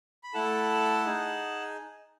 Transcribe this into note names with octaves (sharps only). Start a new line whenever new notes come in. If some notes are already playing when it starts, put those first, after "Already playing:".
B5
A3 E4 A4 F#5 A5
D#4 G#4